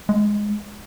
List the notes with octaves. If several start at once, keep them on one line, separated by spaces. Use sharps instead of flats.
G#3